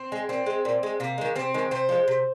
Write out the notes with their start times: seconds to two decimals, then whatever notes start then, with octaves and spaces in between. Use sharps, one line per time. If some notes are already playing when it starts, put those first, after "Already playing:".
Already playing: C4
0.12 G#3
0.29 A#2 C4
0.46 G#3
0.65 A#2
0.83 G#3
1.00 C3 A#3
1.18 D#3 G#3
1.35 C3 C4
1.54 D#3 G#3
1.71 C3 C5
1.89 F3 G#3
2.08 C3